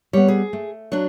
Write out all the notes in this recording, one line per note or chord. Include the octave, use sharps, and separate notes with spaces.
G3 B3 C#5
G#4
A3
F#3 D4